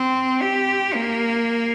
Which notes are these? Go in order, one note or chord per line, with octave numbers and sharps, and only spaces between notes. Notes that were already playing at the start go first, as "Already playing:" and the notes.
Already playing: C4
G4
A#3